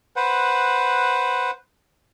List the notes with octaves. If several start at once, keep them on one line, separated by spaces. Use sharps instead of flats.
B4 C5 F#5